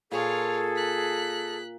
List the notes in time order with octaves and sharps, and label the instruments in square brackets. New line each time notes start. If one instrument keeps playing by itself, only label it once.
[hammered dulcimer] A#2 [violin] F4 C#5 [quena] G#4 [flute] A4
[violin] F#6 B6